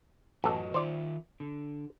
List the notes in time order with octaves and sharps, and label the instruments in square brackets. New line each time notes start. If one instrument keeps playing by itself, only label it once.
[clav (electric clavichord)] A1 A4 [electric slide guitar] F#2 F#4 D#5
[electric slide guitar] D#3 F4 [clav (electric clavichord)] C5 D5
[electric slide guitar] D3